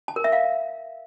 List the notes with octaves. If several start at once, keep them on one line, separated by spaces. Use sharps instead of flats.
A5
A#4
E5
F5